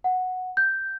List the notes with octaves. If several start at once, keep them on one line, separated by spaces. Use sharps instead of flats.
F#5
G6